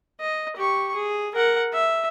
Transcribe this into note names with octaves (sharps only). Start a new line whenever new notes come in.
D#5
G4 C#6
G#4
A#4 F#5
E5